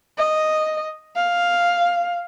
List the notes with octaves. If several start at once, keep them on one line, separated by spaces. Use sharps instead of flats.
D#5
F5